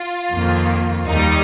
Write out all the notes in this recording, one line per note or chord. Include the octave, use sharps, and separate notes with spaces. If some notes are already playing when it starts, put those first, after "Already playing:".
Already playing: F4
F2 D#3 A#3
D#2 D#3 G3 D#4